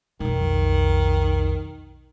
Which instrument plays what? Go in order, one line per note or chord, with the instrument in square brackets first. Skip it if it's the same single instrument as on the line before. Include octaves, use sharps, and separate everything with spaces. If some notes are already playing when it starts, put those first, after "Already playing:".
[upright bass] B1 F2 [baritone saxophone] D#3